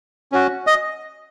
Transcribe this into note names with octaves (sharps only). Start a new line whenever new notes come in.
C#4 F#4
D#5